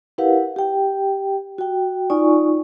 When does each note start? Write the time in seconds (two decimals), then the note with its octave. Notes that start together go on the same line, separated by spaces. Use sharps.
0.18 E4 G4 A#4 B4 F5 F#5
0.56 G4 G5
1.58 F#4 G5
2.10 D#4 F4 D5 G#5 C#6